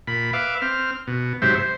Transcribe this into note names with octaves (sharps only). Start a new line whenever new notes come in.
A#2 B5
B4 E5 F5 D6
C4 F6
B2
G#2 C3 F#3 G4 C5 E5
C5